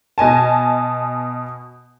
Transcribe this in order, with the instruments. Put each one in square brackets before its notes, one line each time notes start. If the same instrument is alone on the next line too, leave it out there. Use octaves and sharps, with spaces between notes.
[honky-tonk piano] B2 D#5 G#5 A5